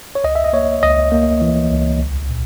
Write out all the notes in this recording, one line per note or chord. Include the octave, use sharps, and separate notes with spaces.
C#5
C#2 D#5
E5
D#5
A#3 C#5
C#2 D#5
A#3
E3
C#2
B1
A#2